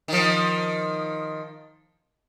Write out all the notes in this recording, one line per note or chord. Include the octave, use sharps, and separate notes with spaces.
D#3 F3